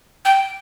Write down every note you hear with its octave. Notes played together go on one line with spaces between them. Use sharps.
G5